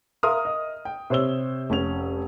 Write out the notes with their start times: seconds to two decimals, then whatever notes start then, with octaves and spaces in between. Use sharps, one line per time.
0.23 A#4 E5 F5 C6 D#6 F6
0.45 D#5
0.85 G5
1.10 C3 C5 C#5 E6 G7
1.70 F1 C#4 F7